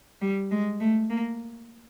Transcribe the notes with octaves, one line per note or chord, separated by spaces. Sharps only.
G3
G#3
A3
A#3